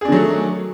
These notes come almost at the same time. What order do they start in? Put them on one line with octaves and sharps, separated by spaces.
G#4 D4 D#3 F#3 A3